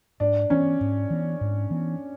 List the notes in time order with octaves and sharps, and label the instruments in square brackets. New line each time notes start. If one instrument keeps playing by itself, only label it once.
[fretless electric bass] G#2 [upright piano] D4
[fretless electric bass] E3 B3 [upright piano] C#4
[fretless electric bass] G#2
E3 B3
G#2
E3 B3